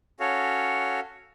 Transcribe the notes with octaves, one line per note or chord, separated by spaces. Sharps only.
C#4 F#4 A4 C#5 F5